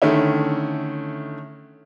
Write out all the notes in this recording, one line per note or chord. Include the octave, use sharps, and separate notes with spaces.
D3 D#3 A3 C#4 E4